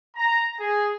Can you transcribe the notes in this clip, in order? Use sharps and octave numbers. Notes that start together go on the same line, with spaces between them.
A#5
G#4